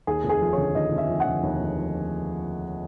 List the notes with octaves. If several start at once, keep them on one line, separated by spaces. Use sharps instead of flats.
D#2 G#4
F1
G#4
F3
D3 C#5
D#2 D#5
F1
E5
F3
F#5
D3
D#2
F1
F3